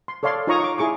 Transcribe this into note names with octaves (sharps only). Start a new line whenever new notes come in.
C6
A4 C#5 D5 F5 C6
D#4 F4 C#5 A#5 C#6 D#6
C#6 D6
E4 G#4 C#6 D6